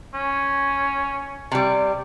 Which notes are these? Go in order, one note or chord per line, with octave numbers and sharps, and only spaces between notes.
C#4
C3 G3